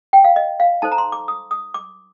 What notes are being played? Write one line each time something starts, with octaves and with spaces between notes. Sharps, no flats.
G5
F5
D#5
F5
D#4 A4 C5 A5
A#5
C6
D6
D#6
D#6
D6